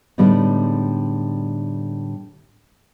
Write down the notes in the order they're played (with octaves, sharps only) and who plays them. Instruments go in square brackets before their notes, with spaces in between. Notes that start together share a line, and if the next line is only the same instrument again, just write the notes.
[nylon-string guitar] A2 D3 G3 G#3 B3 D#4